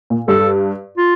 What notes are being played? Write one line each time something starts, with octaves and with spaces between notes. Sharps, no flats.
A#2
G2 A4
F4